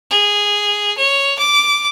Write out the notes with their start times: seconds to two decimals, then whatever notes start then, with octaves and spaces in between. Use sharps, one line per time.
0.10 G#4
0.97 C#5
1.38 D6